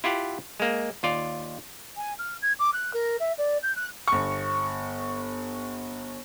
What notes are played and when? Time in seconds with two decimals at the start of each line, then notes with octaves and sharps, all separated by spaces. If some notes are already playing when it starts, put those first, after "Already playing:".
0.04 E4 F4 G4 F#5
0.60 G#3 A#3
1.03 D#2 F4 D5
1.97 G#5
2.19 F6
2.42 G#6
2.59 D6
2.73 F#6
2.93 A#4
3.20 E5
3.38 D5
3.63 G6
3.76 F#6
4.08 G1 C#6